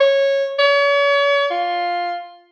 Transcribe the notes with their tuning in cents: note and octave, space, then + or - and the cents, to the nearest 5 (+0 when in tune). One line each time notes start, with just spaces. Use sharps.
C#5 -10
C#5 +40
F4 +5